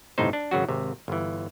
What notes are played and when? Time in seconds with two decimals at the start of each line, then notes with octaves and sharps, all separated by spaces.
0.18 G1 A2 C3 D#4 C5
0.33 D4
0.51 G#1 C#3 F#3 F#4
0.69 G#1 C3
1.08 G1 E3